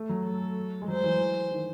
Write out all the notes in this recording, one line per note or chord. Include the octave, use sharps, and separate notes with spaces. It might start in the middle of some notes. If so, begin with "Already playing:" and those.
Already playing: A3
F#3
A4
G#3
F#3 C5
E3
D#3